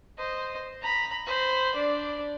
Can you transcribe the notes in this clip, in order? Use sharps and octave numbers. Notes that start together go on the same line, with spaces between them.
C5 D#5
A#5 B5
C5 B5
D4 D5